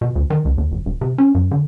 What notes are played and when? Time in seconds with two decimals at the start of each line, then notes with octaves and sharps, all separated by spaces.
0.01 B2
0.15 D2
0.30 D#3
0.45 C#2
0.58 D#2
0.72 G1
0.86 E1
1.01 C3
1.18 C#4
1.35 F#2
1.51 D3